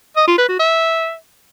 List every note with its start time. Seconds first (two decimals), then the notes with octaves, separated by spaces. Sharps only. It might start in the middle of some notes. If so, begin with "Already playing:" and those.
0.17 D#5
0.27 F4
0.38 B4
0.49 F#4
0.59 E5